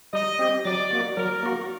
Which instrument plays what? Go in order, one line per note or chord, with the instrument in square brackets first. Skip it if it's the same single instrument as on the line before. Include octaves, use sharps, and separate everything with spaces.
[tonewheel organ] G3 [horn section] D#5
[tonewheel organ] C4 G4
[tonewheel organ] F#3 [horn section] D5
[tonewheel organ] A#3 F#4
[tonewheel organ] F#3 [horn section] A#4
[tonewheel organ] A#3 F#4